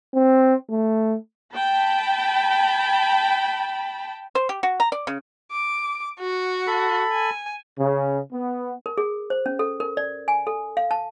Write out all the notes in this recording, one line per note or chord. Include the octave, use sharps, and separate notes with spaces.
C4
A3
G5 A5 B5
C5
G4
F#4
A#5
D5
C#3
D6
F#4
A4 B5
G#5
C#3
B3
A#4
G#4
C5
C#4
A4
A#4
D5
G#5
A4
F5
A5